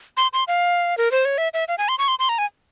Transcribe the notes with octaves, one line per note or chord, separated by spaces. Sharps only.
C6
C6
F5
A#4
C5
C#5
E5
E5
F5
G#5
C6
C#6
C6
C6
A#5
G#5